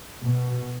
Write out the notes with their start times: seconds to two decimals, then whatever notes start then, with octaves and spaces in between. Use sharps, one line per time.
0.21 B2